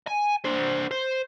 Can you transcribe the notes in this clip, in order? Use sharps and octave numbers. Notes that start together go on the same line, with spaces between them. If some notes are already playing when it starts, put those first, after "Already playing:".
G#5
D4 C5
C5